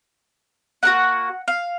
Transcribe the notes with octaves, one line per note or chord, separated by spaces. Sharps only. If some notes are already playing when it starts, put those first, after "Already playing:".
A#3 D#4 F#4 F#5
F5